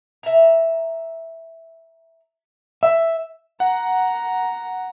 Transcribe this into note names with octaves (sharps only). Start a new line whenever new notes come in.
E5 A#5
E5
F#5 A#5